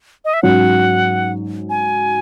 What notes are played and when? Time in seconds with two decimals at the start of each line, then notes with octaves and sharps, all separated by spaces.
0.25 D#5
0.34 E5
0.43 G#2 F#3 C#4 F#5
1.70 G#5